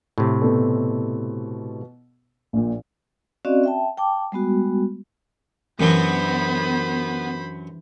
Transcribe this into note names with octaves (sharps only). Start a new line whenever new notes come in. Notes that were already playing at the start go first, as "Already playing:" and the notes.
A2 C3
B2 A4
A#1 A#2
C4 C#4 F#4 D5 D#5 F5
E5 G5 A5
G5 A5 D6
G3 G#3 B3 F#4
F#2 E3 F#3 B3 D4 G4 C5 B5